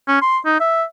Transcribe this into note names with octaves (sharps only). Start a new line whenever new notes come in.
C#4
C6
D#4
E5